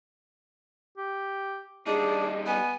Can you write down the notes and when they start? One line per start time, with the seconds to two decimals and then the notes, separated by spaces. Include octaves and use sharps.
0.98 G4
1.87 G3 D4 D#4 G#4
2.47 B3 G#5